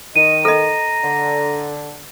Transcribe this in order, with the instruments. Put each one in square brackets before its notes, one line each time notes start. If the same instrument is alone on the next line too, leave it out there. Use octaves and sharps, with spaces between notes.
[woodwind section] D#3 [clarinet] D#5 [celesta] D#7
[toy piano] A4 D#5 [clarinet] A#5
[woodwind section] D3